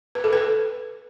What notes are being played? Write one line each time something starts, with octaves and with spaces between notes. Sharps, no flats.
B4
A4
B4